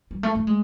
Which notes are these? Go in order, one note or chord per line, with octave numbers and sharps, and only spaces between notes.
G3
A3
A3
G#3